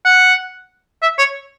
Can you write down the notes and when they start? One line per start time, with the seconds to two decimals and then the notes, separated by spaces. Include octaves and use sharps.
0.05 F#5
1.02 E5
1.18 C#5